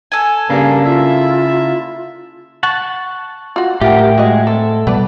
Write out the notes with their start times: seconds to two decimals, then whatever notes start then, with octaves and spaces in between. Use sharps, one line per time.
0.12 A4 G#5
0.50 G2 C#3 A#3 D4
0.85 E4 F4 E5
2.63 F#5 A5 C#6
3.56 F4 F#4
3.81 A2 F4 G4 A#4 E5 F#5 G5
4.18 G#3 F#4 D#5
4.47 C4 A4
4.87 B2 G3 B3 B4 D5